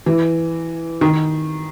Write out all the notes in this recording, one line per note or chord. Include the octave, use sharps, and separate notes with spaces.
E3
D#3